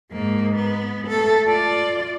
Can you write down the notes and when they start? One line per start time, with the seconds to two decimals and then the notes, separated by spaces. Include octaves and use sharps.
0.11 G#2 A#3
0.55 B3
1.08 A3 A4
1.46 F4 D5